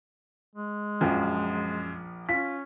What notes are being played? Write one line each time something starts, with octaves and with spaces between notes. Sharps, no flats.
G#3
A#1 F#2 F3 G5
C#4 F4 B6